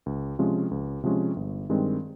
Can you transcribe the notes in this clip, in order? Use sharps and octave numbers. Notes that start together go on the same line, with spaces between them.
C#2
C3 F3 G#3 C#4
C#2
C3 F3 G#3 C#4
G1
G2 D#3 G#3 C4